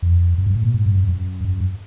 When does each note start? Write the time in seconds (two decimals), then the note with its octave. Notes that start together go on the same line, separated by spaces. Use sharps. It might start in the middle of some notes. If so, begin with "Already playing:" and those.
0.02 F2
0.38 F#2
0.46 G2
0.56 A2
0.65 A#2
0.74 G#2
0.86 G2
0.97 F#2
1.09 F#2
1.44 F#2